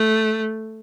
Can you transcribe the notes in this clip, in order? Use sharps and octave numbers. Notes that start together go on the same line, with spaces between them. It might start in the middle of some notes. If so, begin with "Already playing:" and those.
Already playing: A3